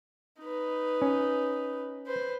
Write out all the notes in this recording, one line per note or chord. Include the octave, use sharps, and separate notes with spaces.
D#4 B4
C#4
B4 C5